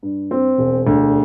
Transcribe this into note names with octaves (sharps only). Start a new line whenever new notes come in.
G2
C4
E1
D2